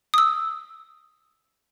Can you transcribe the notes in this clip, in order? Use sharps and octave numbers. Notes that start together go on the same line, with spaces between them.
D#6 E6